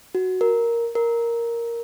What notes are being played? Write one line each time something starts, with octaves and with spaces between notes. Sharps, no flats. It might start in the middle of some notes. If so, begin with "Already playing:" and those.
F#4
A#4
A#4